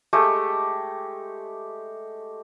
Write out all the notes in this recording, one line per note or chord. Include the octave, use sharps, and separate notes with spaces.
G#3 A3 G4